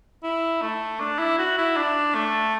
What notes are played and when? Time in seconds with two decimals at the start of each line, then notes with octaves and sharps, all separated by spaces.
0.23 E4
0.62 A3
1.00 D4
1.19 E4
1.39 F#4
1.58 E4
1.77 D4
2.15 A3